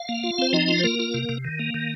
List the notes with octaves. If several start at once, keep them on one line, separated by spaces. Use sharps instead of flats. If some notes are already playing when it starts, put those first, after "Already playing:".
Already playing: F5
A#3
F4
C4 C5
F3 D#4 D#5
F4
C5
A#3 A#4
F4
C3
C3
D#3
A#3
D#3